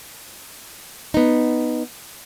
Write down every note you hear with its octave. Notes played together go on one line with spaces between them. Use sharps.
B3 D#4